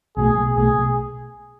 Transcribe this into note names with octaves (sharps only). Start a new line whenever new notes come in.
B1 B2 A3 G#4
B1 B2 A3 G#4